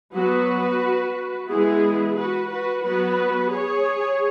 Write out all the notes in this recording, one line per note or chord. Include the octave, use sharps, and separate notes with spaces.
F#3 B3 F#4 B4
E3 G#3 B3 E4 G#4
F#4 B4
F#4 B4
F#3 B3 F#4 B4
G#4 C#5